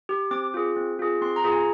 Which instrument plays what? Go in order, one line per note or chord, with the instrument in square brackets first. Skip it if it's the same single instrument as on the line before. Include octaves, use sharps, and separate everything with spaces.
[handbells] G4
C4 D6
F4 G#4
C4
F4 G#4
C4 C6
A#5
F4 G#4
G#5